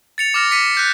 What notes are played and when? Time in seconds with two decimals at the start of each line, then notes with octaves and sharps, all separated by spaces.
0.18 A6 C#7 F7
0.34 D6 F6 A#6
0.51 B6 C#7 D#7
0.75 F#6 G6 B6